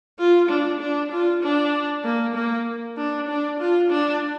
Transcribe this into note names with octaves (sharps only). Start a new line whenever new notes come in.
F4
D4
D4
F4
D4
A#3
A#3
D4
D4
F4
D4